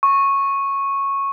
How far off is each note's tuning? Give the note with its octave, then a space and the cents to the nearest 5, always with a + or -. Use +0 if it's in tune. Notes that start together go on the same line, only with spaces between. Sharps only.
C#6 -10